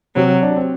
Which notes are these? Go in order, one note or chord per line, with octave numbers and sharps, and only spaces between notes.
C3 F#3 C4
D4
C4